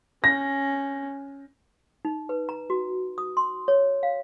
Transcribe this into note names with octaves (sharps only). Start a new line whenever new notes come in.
C#4 A#6
D#4
B4
A#5
F#4
D#6
C6
C#5
F5